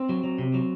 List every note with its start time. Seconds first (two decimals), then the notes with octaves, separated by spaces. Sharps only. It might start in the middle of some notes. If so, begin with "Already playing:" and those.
Already playing: C4
0.09 F#3
0.24 F#3
0.39 C3
0.54 F#3